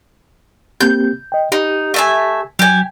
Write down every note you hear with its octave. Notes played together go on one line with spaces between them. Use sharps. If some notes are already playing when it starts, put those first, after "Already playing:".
A#3 C4 G4 G6
D#5 G5
D#4 G4
A3 E5 G#5
F#3 G4 G#5